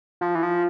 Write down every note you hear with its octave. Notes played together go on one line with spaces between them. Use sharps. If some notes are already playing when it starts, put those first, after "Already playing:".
F3
E3
F3